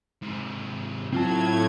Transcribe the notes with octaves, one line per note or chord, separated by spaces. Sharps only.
G#2 C3
A2 F#3 C4 F4 A5 G#6